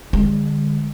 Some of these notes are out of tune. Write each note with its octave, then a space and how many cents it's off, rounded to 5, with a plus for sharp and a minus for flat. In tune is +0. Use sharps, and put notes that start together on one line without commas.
D3 +20 G#3 -35